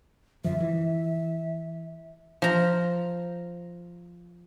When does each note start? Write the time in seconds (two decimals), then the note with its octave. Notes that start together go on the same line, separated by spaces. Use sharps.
0.44 F#2 D3 F3 E5
0.60 E3
2.42 F3 A#5